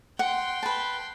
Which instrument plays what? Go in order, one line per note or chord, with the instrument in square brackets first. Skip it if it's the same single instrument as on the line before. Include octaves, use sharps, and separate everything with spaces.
[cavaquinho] F#5 [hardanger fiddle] G5 C6
[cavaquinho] B4 A5